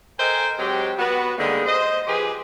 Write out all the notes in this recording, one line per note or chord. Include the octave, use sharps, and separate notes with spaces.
A4 A#4 C5 D#5 G5 G#5
F#3 G#3 C4 G4
B3 F#4
D3 G3 G#3 A#3 B3 D#4
C5 D#5
F3 G4 G#4 B4 C5